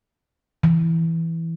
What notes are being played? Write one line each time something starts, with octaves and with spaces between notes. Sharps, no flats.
E3